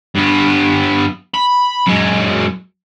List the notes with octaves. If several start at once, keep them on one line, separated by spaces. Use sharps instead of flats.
G2 B3
B5
F#2 G#3